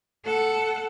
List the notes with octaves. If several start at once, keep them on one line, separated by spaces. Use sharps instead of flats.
A4 F#5